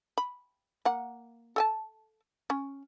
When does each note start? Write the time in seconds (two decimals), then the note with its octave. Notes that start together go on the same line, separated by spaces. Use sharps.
0.18 B5
0.85 A#3 F#5
1.56 A4 G#5 A5
2.50 C#4